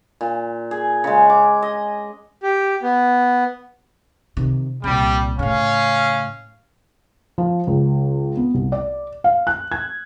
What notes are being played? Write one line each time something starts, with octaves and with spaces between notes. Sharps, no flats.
A#2
G#4
C#3 G#3
D6
D#5
G4
B3
C3 D#3
C2 A#2 G3
A2 C#3 C#4 F5
F3
C#2
B3
C2
D5
F5
F#6
G#6